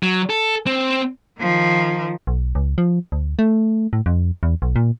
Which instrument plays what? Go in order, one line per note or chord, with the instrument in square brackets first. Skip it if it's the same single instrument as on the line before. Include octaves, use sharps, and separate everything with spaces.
[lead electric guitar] F#3
A4
C4
[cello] D#3 F3
[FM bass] B1
C#2
F3
D2
A3
A2
F2
E2
B1
A#2